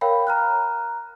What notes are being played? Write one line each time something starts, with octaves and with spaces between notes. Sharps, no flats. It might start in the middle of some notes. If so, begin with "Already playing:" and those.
A#4 C#5 F5 G5 B5
A#5 F6 F#6